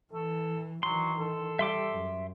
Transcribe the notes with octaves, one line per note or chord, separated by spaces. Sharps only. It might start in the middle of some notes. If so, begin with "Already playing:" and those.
E3 A4
D#3 E3 F#3 C6
A4
G3 E5 C6 D6
F#2